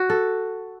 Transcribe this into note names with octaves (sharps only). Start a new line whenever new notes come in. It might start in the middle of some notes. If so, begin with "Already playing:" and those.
Already playing: F#4
A4